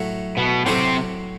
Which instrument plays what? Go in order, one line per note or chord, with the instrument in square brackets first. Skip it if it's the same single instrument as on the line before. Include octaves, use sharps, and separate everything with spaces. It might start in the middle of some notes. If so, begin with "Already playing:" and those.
Already playing: [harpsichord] A2 F#3 A3
[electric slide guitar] B2 B3
[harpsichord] A2 F#3 A3 [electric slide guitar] C3 C4